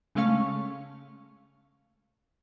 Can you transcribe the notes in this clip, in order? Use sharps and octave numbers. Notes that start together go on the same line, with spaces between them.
C#3 G#3 A3 C#4 F5 C#6